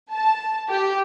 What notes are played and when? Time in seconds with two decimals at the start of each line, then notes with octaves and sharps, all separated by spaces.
0.13 A5
0.70 G4